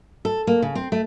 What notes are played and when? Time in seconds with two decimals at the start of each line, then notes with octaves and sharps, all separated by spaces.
0.25 A4
0.47 A#3
0.62 C#3
0.75 C4
0.92 A3